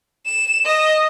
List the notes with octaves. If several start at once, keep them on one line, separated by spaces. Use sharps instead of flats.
E7
D#5